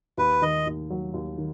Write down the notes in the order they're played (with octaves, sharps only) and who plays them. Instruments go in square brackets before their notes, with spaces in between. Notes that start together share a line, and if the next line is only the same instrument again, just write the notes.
[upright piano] D#2 [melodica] B4
[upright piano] D#3 [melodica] D#5
[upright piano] D#2
F#3
D#2
D#3